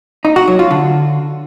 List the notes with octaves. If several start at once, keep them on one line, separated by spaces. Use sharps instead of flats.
D#4
F#4
F#3
F4
D3